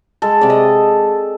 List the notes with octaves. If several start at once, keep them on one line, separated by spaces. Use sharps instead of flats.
G#3 A4
C3 D5
D#5